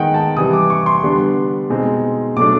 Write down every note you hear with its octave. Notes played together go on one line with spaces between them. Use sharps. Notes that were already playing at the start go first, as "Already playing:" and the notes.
Already playing: D#3 G#3 B3 D#4 F#5 G5
A5
C3 E3 G3 D#6
D6
C#6
C6
D3 G3 B3 D4
B2 G#3 C4 D#4
B2 F#3 A3 D4 D6